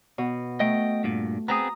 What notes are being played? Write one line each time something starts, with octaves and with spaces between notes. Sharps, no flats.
B2
A3 D#5 G5
G2 A#2
B3 C4 G#4 A#5 D#6